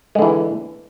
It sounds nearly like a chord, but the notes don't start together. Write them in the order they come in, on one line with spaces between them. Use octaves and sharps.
G#3 D3 E3